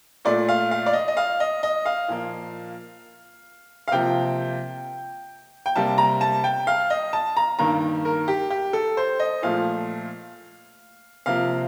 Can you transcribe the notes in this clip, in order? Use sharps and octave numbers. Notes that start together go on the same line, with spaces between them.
A#2 A3 D5
F5
F5
D5
D#5
D#5
F5
D#5
D#5
F5
A#2 F3 A#3
F5
C3 F3 A#3 G5
G5
C3 G3 A#3 A5
A#5
A5
G5
F5
D#5
A5
A#5
G2 D#3 A#3 A#5
A#4
G4
G4
A4
C5
D#5
A#2 F3 A3 F5
C3 F3 A#3 F5